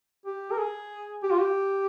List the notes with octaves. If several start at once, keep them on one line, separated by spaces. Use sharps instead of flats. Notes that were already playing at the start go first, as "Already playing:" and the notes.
G4
A#4
G#4
G4
F4
G4